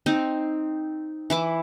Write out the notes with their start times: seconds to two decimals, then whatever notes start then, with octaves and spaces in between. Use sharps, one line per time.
0.06 C4 D#4
1.30 E3 E4 D6